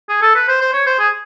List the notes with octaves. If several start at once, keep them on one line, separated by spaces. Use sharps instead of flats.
G#4
A4
B4
C5
C5
C#5
C5
G#4